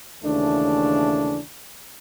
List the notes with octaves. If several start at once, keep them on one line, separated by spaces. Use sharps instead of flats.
D#2 C#3 E3 A3 D4